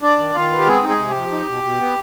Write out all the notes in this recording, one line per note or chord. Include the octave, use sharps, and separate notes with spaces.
D4 D5
D#3
D#3 F4 F5
B3
G4
G#3 C4 G#4
D#4
G#3 G#4
C3
G4
F3
D#4
B2
B2
B3